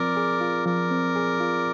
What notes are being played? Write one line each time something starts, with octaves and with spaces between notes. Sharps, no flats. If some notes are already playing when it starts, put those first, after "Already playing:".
Already playing: F3 C4 F4 A#4 D5
G#4
F4
F3 A#4 D5
C4
G#4
F4